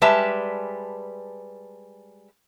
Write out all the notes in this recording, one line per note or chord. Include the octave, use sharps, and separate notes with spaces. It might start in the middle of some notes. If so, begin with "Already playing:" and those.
G3 G#3 B4 D5 E5 A5